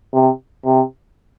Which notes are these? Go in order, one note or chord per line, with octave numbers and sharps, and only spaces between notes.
C3
C3